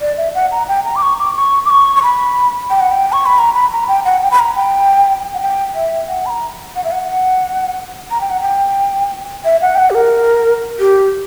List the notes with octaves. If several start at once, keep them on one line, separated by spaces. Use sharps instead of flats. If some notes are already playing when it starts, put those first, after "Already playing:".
D5
E5
F#5
A#5
G5
A#5
D6
C#6
D6
C#6
D6
C#6
C#6
B5
G5
F#5
G5
C#6
B5
A#5
B5
A#5
G5
F#5
G5
B5
A#5
G5
F#5
G5
E5
F#5
B5
A#5
F#5
E5
F#5
A#5
G5
F#5
G5
E5
F#5
G5
F#5
G4
A#4
G4